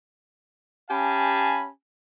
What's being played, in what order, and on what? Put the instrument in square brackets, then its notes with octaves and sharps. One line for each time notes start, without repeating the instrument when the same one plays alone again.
[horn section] C#4 G4 F5 G#5 A5 B5